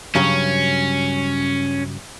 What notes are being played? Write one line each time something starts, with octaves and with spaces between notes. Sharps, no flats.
G2 C#3 F#3 C#4